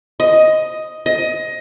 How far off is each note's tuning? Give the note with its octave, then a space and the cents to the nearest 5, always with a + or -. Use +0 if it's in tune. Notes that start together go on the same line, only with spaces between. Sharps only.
D#5 +5
D#5 +15